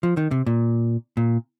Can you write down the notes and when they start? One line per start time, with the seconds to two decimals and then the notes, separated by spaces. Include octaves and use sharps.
0.03 F3
0.17 D#3
0.31 C3
0.46 A#2
1.17 A#2